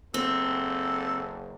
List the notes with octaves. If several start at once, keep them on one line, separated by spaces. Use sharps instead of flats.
F#1 C4 A4